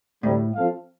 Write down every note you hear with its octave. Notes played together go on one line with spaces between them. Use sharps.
D2 A2 C3 G3
F3 C4 A4 F5